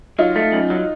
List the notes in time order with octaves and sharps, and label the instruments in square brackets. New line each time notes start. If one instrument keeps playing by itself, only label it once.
[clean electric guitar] F#3 [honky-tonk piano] D#4 F4
[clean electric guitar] A3
F#2
F#3